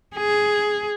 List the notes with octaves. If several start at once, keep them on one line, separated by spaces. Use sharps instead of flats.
G#4